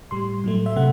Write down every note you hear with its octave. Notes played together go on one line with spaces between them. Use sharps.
A2 G3 C6
A2 F#3 A3
E5
C3 A3 F#5